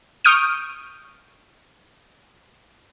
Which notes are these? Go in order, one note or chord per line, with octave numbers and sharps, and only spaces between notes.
C#6 D#6 F6 G6 D7 D#7